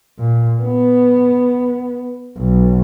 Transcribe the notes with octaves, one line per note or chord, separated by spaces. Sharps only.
A#2
B3
B1